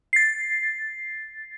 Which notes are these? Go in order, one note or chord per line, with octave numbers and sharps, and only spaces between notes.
A6 C7